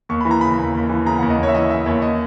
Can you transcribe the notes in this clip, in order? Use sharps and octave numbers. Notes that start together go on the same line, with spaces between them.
D#2 C#6
E3 B5
A#5
C#3 B5
D#2
D#2
E3
C#3 A#5
D#2 F#5
D#5
D#2 C#5
E5
E3 D#5
C#3 E5
D#2 C#5
D#5